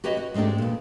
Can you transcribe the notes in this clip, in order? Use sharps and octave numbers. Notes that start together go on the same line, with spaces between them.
F#4 G4 B4 C#5 D#5
F#4
G#2 G#3 A3 D4 G4
E2 A#2